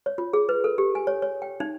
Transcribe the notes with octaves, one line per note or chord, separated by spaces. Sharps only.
C#5
F4
G#4
B4
A4
G4
G#5
C#5
C#5
G5
D#4